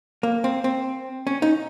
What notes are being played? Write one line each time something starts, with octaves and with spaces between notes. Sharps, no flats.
A#3
C4
C4
C#4
D#4